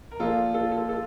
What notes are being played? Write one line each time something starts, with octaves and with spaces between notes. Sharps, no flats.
A#4
A#2 F3 F4 A4
F4 A4
F4 A4
F4 A4